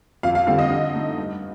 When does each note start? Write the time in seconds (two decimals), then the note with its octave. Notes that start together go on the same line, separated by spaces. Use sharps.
0.23 F2 F5
0.35 F5
0.47 D3 G3 C4 F5
0.59 D#5
0.70 D3
0.94 A3 D#4
1.18 G2